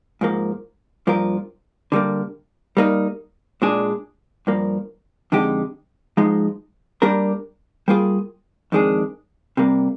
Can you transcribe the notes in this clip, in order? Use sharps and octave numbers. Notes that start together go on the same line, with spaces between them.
G#2 F3 A#3
G2 F3 A#3 F4 A#4
D3 G3 A#3
G3 A#3 D#4
A#2 G#3 D4 G#4
G2 F3 A#3
F2 D3 G#3 D#4 G4
G#2 F3 G#3 D#4
G3 A#3 D4 G4 A#4
G3 A#3 F4 G#4
F2 D#3 G#3 D4 G#4
C3 G3 A#3